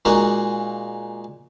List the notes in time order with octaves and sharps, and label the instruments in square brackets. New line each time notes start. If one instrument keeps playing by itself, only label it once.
[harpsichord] A#2 G#3 A#3 D#4 F#4